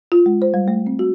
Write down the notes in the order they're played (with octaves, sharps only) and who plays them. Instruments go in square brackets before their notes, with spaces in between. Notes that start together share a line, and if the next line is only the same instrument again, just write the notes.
[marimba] F4
G#3
C5
G3
A3
C4
F#4